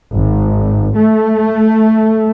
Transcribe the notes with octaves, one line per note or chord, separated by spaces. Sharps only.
G#1
A3